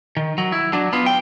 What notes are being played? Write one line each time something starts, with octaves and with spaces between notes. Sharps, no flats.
D#3
F#3
E4
F#3 D4
B3 F4
G5